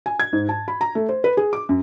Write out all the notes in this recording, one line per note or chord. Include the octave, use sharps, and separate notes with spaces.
G#5
G#6
G#2
A5
B5
A#5
A3
C5
B4
G#4
D6
F#2